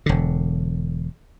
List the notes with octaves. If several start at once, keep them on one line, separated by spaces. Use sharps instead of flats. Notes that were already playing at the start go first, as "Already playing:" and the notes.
E1 D3